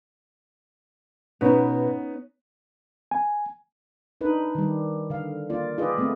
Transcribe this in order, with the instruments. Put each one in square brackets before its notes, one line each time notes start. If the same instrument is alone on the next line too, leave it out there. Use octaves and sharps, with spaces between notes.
[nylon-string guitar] B2 [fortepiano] B3 C#4 D#4
[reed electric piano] G#5
[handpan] D4 D#4 B4
D#3 G3
D3 F5
A#3 F4 D5
F4 G4 G#4 B4 D#5
G#3 A3 B3 C4